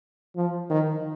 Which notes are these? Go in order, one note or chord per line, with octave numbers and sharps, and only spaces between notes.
F3
D#3